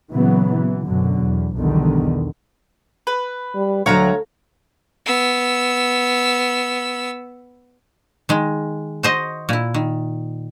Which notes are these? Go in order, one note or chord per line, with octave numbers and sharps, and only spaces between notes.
A#2 C#3 E3 F#3 B3
E3
F#2 B2 D3 F#3
E2
B1 E2 D3 D#3 G3
B4
G3
D2 F#3 A4 C#5 F5 A#5
B3 E6
D#3 G#3
F#4 C5 D#5
A#2 E4
D#3